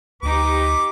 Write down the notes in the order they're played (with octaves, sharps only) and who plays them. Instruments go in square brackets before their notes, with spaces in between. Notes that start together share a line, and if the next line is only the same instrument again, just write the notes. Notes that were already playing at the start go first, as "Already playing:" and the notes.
[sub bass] D2 [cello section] D#4 G4 B4 [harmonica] D6